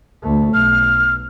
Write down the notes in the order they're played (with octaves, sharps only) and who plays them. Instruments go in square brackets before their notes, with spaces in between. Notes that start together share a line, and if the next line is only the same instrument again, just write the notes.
[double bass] D2 A3
[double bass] B1 [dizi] F6